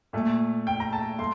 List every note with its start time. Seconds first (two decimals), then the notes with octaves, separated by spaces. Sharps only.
0.13 A#2 A3
0.67 G5
0.80 A#5
0.93 A5
1.19 A3 C6